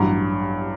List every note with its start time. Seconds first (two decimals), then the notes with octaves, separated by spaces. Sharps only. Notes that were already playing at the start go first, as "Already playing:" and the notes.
Already playing: A1 G2 F#3